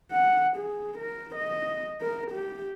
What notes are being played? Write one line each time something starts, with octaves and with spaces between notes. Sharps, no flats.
F#5
G#4
A#4
D#5
A#4
G4